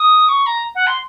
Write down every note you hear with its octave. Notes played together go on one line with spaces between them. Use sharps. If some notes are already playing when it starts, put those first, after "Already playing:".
Already playing: D#6
C#6
A#5
F#5
C6